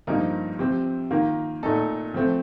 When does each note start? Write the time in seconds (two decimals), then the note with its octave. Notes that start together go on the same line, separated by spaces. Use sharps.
0.07 G2 F3 A#3 D#4 A#4
0.59 C3 F3 C4
1.11 D#3 A#3 F4 A#4
1.63 A#2 A3 D#4 A4
2.14 F3 A3 C4